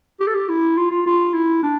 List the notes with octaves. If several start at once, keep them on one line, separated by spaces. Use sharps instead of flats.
G4
A4
G4
E4
F4
F4
F4
E4
D4